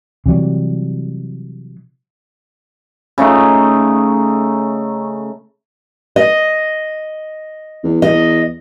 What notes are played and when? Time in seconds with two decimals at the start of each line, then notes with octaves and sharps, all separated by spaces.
0.26 C3 E3 F#3 G3
3.18 C#3 A3 D#4
6.16 D#5
7.84 E2
8.02 E2 D#5